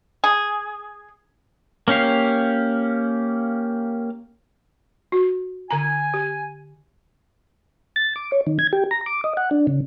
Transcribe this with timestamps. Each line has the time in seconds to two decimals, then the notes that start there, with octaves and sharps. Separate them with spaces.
0.24 G#4
1.88 A#3 C#4 G4 F5
5.12 F#4
5.71 D3 G#5 A#5
6.14 G4
7.96 A6
8.16 D6
8.32 C#5
8.47 D#3
8.59 G#6
8.73 G4
8.91 A#5
9.06 D6
9.24 D#5
9.37 F#5
9.51 D4
9.67 C#3